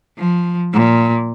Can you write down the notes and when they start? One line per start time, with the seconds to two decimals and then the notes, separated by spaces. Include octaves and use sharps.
0.17 F3
0.73 A#2